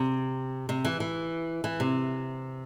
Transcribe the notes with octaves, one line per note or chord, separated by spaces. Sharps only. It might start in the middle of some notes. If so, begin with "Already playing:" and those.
Already playing: C3
C3
E3
E3
E3
C3